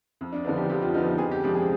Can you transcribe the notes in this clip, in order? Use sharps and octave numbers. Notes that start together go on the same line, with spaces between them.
F2
D4
D3 F3 B3 D#4
G4
F2 G4
F4
D3 F3 B3 D#4
G4
F2 G#4
G4
C3 F3 G#3 D4 G4
G#4